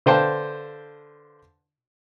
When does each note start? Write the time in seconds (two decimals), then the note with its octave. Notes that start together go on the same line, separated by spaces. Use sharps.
0.06 D3 B4 C5 F5 G5 A5